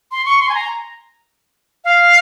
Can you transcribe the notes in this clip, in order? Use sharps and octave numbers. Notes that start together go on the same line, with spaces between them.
C6
C#6
C6
G#5
A#5
F5